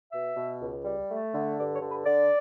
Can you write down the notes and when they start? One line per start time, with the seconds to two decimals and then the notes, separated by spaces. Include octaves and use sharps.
0.13 B2 E5
0.37 B2
0.61 C#2
0.85 G3
1.10 A3
1.34 D3
1.58 G2 D5
1.74 C#5
1.82 D3
1.90 B4
2.06 D3 D5